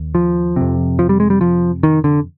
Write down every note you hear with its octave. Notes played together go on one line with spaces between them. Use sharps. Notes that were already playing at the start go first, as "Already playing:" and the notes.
Already playing: D#2
F3
F2 C3
F3
G3
G#3
G3
F3
D#3
D3